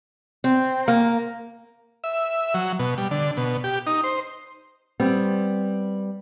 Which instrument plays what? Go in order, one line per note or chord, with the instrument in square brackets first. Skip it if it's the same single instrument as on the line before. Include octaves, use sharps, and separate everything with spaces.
[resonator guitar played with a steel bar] C4
A#3
[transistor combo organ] E5
F#3
B2
G3
D3
B2
G4
D#4
C5
[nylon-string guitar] G3 B3 C4